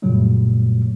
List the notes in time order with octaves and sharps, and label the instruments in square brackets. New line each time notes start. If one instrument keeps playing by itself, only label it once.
[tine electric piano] F#2 A#2 C#3 F#3 G3 A3